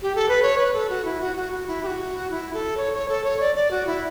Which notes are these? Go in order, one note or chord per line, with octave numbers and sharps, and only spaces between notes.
G4
A4
B4
C#5
B4
A4
F#4
E4
F#4
F#4
F#4
E4
G4
F#4
E4
A4
C#5
C#5
A4
C#5
D5
D5
F#4
E4